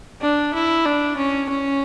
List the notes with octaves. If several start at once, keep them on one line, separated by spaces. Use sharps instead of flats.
D4
E4
D4
C#4
C#4